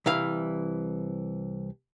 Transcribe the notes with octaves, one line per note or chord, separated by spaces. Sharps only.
C2 E3 F5